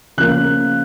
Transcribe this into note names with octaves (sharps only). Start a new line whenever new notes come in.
C#3 F3 A#3 F#6